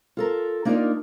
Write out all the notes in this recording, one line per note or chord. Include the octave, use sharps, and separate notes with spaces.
F4 A4 A#4
A#3 D4 D#4 F4 A#4 D5